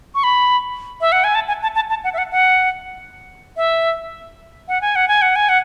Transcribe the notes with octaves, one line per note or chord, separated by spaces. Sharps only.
C#6
B5
E5
F#5
G#5
A5
G#5
A5
A5
A5
F#5
E5
F#5
F#5
E5
F#5
G#5
F#5
G#5
F#5
G#5
F#5